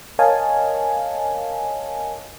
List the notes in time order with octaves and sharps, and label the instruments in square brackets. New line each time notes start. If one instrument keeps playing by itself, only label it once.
[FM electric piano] A#4 C#5 D#5 F5 G#5 A5